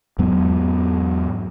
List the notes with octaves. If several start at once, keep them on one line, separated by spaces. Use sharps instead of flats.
E2 G#2 F#3 B3